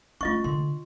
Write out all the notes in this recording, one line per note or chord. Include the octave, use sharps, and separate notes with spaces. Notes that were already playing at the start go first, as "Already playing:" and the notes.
A3 C#4 F4 D#5 C#6
D3 C6